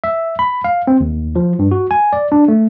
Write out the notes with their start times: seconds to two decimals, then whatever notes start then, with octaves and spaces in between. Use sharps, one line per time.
0.04 E5
0.39 B5
0.64 F5
0.87 C4
1.00 D#2
1.36 F3
1.59 G2
1.71 F#4
1.91 G#5
2.13 D5
2.32 D4
2.48 A3